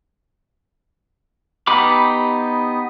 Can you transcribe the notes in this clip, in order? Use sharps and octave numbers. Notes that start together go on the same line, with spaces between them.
B3 D#4 G4 B5 D6